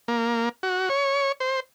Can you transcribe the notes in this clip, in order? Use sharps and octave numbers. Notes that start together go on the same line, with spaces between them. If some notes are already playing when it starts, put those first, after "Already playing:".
A#3
F#4
C#5
C5